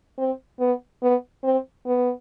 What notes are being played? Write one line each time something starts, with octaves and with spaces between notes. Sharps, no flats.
C4
B3
B3
C4
B3